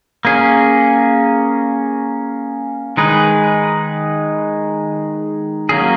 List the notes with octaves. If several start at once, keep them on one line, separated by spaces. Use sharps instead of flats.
A#3 C#4 G#4
D#3 G#3 D#4 G#4 B4
F#3 A#3 C#4 G#4